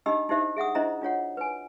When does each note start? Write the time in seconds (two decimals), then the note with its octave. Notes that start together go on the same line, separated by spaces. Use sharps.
0.06 D4 D#4 G4 D#5 B5 E6
0.29 D#4 E4 G4 C5 E5
0.56 G#4 E5 F#5 D#6
0.75 D4 E4 C5 D#5 E5 A#5
1.02 D4 F4 C#5 F#5
1.37 B4 G#5